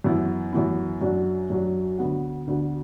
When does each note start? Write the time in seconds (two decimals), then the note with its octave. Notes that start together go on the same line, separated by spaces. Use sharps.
0.04 F#2 E3 B3 E4
0.53 F#2 E3 B3 E4
1.01 F#2 F#3 D4 F#4
1.50 F#2 F#3 D4 F#4
1.98 D2 D3 B3 F#4
2.47 D2 D3 B3 F#4